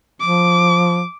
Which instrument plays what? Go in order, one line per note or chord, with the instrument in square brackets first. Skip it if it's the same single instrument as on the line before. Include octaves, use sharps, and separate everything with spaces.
[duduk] F3 [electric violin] D6